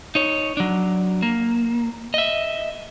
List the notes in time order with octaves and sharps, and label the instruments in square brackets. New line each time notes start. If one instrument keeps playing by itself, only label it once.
[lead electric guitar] D#4 C#5
F#3 D4
A#3
D#5 E5